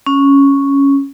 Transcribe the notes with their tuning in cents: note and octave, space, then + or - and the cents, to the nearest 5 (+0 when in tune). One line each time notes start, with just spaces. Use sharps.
C#4 +0